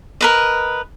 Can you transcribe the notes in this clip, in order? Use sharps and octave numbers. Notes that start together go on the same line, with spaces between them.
A#4 B4 D#5